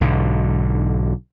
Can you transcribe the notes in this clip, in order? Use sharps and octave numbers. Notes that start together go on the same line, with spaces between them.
B1 G#2 D3